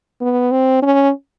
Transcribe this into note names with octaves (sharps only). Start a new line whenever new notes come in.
B3
C4
C#4